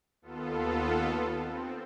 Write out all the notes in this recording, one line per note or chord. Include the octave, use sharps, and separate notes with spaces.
D#2 B3 F4 A4
C4